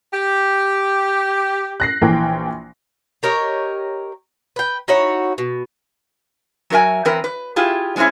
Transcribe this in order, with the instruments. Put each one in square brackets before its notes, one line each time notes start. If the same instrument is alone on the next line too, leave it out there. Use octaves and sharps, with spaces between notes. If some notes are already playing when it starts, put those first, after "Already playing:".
[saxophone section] G4
[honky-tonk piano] F#6 A#6 C7
A#1 E3 G5
[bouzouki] G4 A#4 C#5 D#5
B4 G5
D#4 E4 F#4 C#5
B2
[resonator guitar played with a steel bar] F#3 F#4 A#4 E5 G#5
E3 C4 A#4 B4
B4
E4 F4 G4 G#4
F#3 G#3 C4 C#4 E4